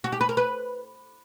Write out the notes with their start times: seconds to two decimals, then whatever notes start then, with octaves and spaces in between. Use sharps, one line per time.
0.04 F#4
0.12 G4
0.21 B4
0.29 A#4
0.37 B4